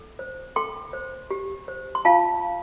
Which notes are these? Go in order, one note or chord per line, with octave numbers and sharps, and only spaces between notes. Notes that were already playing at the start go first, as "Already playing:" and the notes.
Already playing: A4
C5
A4 G5 C6
C5
G4
C5
C6
F4 F5 A5